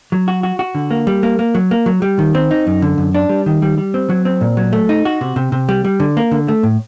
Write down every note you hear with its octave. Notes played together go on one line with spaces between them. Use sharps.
F#3
F#4
F#4
F#4
D3
A#3
G3
A#3
A#3
F#3
A#3
F#3
G3
D#3
C4
D#4
F#2
D3
F#2
D4
G3
D#3
G3
G3
C4
F#3
C4
A#2
F#3
A3
D#4
F#4
C3
C3
C3
G3
G3
D3
A#3
D3
A3
A2